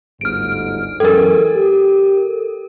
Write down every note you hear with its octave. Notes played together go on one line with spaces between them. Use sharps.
G1 D2 G#2 F6 D7
F#2 E3 G#3 A4 A#4
G4